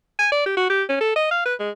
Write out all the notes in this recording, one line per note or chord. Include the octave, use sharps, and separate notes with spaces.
G#5
D5
G4
F#4
G4
C#4
A4
D#5
F5
B4
G#3